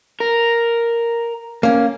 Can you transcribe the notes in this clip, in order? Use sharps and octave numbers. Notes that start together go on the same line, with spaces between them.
A#4
A#3 C#4